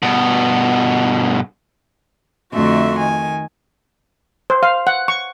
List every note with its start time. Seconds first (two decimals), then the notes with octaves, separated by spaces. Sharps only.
0.03 G2 B2
2.53 F2 D3 A3 F#4 E5 C6
2.96 D#3 G#5
4.50 C5
4.63 F5
4.87 F#5
5.08 C#6